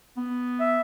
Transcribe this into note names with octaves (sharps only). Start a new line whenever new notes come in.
B3
E5